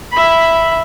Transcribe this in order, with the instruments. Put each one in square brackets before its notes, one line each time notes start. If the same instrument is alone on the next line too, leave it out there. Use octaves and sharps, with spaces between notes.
[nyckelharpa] E5 B5